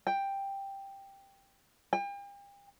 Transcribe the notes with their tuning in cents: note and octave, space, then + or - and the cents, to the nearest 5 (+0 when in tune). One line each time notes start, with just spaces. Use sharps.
G5 +5
G5 +40